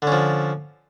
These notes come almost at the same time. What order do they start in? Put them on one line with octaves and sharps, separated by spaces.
D3 C#4 F3